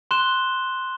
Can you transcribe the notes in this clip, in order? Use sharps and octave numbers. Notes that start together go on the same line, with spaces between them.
C6 F#6 E7 G7